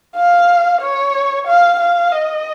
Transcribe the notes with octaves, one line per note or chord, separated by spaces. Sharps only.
F5
C#5
F5
F5
D#5